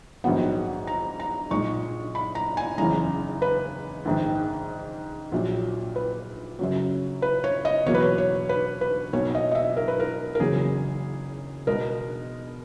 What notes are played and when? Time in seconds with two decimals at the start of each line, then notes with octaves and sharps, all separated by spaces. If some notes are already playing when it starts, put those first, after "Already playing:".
0.24 A#1 G#2 D#3 F#3 B3 F#5
0.87 A#5
1.20 A#5
1.51 B1 A#2 G#3 C#6
2.15 B5
2.35 A#5
2.57 G#5
2.78 F#1 E2 C#3 E3 G#3 A#5
3.42 B4
4.05 A#1 G#2 D#3
5.32 A#1 A#2 F#3
5.96 B4
6.59 F#2 C#3 F#3
7.22 B4
7.44 C#5
7.65 D#5
7.86 E2 B2 F#3 A#3 C#5
7.94 B4
8.03 C#5
8.18 C#5
8.49 B4
8.81 B4
9.13 B1 B2 A#3 C#5
9.35 D#5
9.52 D#5
9.55 E5
9.77 A#4
9.88 B4
10.00 A#4
10.35 A#4
10.40 F#1 E2 C#3 F#3 A#3 G#4
11.67 B2 G#3 B3 A#4